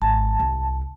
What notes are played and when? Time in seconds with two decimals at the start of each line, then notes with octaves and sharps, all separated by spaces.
0.02 G#1 A5
0.39 C2